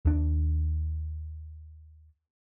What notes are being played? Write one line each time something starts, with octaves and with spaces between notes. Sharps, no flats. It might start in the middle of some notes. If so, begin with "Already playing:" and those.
D#2 D4